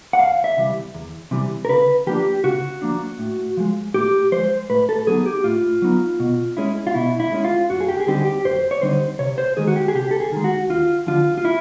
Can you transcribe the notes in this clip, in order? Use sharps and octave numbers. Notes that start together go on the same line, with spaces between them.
F#5
E2 F5
E5
C3 E3 G3
E2
C3 E3 G3
A#4
C#3 B4
F3 A#3 D4 G4
C#3 F#4
F3 A#3 D4
A2
F3 G#3
A2 G4
F3 G#3 C5
A2 B4
A4
F#3 B3 D#4 G#4
G4
A2 F4
F#3 B3 D#4
B2
G#3 C#4 E4
F4
B2 E4
E4
G#3 C#4 E4
F4
F#2 F#4
G#4
G4
G#4
D3 G3 C4 D#4 G4
G4
F#2 C5
C#5
D3 G3 C4 D#4 C5
C3 C#5
C5
D#3 G#3 G#4
F#4
G4
G#4
C3 G4
A4
G#4
D#3 G#3
F#4
D#2 F4
D3 F3 F4
F4
E4